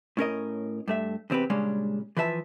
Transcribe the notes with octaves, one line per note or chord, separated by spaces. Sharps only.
A2 C#4 A#4 D#5
G2 A3 E5
E2 C3 C4 G4 B4
A#2 C#3 G3 G#3 C#4 D4
E3 F3 B4 E5 A5